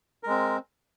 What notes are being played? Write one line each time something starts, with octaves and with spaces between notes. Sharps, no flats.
G#3 C4 A#4